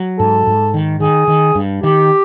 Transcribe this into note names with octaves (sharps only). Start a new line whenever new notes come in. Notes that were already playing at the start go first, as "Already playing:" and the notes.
Already playing: F#3
G#2 A4
G#2
D#3
D#3 G#4
D#3
G2
D#3 G4